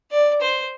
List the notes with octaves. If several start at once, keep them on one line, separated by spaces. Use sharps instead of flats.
D5
C5